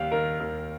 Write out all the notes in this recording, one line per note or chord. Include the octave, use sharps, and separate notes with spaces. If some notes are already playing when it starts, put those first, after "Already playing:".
Already playing: D#2 G3 F5 G5
D#3 A#4
D#2